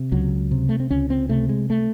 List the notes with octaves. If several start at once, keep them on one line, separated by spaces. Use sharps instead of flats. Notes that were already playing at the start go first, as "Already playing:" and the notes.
Already playing: C3
C#2 F#3
C3
A3
C4
C#2 C#4
C4
C3 A3
G#3
A3